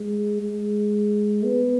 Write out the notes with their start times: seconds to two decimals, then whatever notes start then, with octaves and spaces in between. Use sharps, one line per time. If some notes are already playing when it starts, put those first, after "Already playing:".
Already playing: G#3
0.41 G#3
1.45 B3